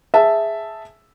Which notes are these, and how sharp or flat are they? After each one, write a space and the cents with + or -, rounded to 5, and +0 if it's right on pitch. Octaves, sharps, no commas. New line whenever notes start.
G#4 +0 E5 +0 A5 +0